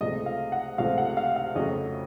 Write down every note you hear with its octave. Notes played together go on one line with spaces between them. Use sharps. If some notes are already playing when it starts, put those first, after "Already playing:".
C#2 C3 F3 A3 D#5
F5
F#5
C#2 C3 F3 A3 F5
F#5
F5
F5
F2 C#3 F#3 A3 D#5